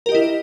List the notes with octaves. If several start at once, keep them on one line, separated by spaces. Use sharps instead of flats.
E4 G4 A#4 D#5